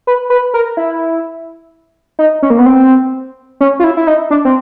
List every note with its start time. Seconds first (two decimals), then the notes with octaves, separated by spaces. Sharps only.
0.07 B4
0.30 B4
0.54 A#4
0.77 E4
2.19 D#4
2.42 C#4
2.50 A#3
2.59 B3
2.66 C4
3.61 C#4
3.80 F4
3.84 E4
3.97 E4
4.07 D#4
4.31 D4
4.45 C4